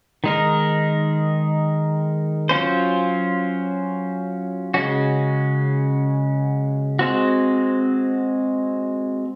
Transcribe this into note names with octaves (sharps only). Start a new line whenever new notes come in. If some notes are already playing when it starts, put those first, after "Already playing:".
D#3 G#3 D#4 A#4
F#3 C#4 F4 C5
C#3 G#3 C#4 F#4
G#3 C4 F#4